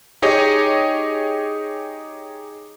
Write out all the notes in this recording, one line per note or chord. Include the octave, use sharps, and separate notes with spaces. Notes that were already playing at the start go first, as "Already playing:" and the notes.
D#4 G4 G#4 C#5 D#5 G#5